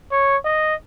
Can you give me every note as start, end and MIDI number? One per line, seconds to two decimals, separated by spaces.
0.11 0.37 73
0.45 0.75 75